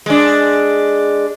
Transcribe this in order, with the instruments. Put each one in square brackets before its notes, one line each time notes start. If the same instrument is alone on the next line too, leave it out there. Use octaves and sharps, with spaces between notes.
[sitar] G#3 D4